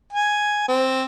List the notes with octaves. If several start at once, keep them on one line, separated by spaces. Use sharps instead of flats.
G#5
C4